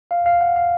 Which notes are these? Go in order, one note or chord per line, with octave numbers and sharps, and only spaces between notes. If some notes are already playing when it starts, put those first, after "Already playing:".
F5
F5
F#5
F5